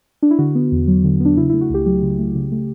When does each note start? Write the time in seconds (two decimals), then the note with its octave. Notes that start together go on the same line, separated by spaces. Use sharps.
0.22 D4
0.31 E4
0.39 D3 F#4
0.55 B3
0.72 E2
0.88 F#3
1.04 D3
1.20 B3
1.25 D4
1.37 C#3 E4
1.49 A3 E4
1.61 F#4
1.70 C#2 G4
1.86 F#3 G4
2.02 C#3
2.19 A3
2.35 C#3
2.52 A3